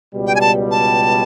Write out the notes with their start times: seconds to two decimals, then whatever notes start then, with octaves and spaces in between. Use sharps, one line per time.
0.12 C#2 B2 G3
0.27 G5
0.35 G#5
0.41 A5
0.71 A5